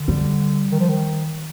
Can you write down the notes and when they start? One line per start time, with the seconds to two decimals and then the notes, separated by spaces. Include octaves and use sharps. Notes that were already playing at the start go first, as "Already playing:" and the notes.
Already playing: D3
0.08 G3
0.71 D#3
0.80 F3
0.89 D#3